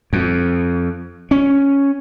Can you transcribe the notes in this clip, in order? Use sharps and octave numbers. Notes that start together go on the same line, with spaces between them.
F2
C#4